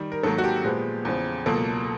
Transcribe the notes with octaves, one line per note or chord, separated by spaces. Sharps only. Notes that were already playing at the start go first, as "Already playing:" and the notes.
Already playing: D#3 G3
A#4
G#2 D#3 F#3 A#3 A4
F#4
G4
A#2 F3 G#3 B3
E2 C#3 F3
C#2 B2 F#3 A#3 A4